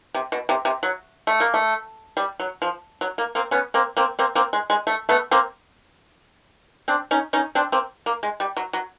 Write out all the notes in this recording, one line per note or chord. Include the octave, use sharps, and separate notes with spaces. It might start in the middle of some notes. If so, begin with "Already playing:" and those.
C3
B2
C3
C3
F#3
A3
A#3
A3
G3
F#3
F3
F#3
A#3
A#3 C4
B3 C#4
A#3 C4
A#3 C4
A#3 C4
A#3 C4
G#3
G#3
A3
A3 B3
A#3 C4
C4 D4
C#4 D#4
C#4 D#4
C4 D4
A#3 C4
A#3
G#3
G3
F#3
F#3